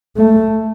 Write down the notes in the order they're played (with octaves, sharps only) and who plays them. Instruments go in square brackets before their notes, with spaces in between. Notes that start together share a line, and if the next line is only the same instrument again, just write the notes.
[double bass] A3